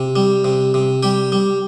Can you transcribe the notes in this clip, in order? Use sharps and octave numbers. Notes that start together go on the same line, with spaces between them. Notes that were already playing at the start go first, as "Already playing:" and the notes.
Already playing: C3
G3
C3
C3
G3 G4
G3